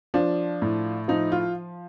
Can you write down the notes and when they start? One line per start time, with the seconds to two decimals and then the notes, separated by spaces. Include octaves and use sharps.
0.14 F3 D4
0.62 A2
1.08 F3 D#4
1.32 F4